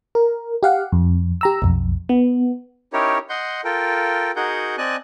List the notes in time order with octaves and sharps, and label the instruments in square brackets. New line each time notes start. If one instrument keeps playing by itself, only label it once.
[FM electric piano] A#4
G4 F5 F#5
F2
G4 A#5 E6
B1 F2
B3
[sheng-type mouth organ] C#4 D#4 E4 G4 A#4 C#5
D#5 F#5 C6 G6
F4 A4 A#4 G5
D#4 F#4 G#4 A#4 F#5 G6
C4 D5 D#5 G#5 A5 F#6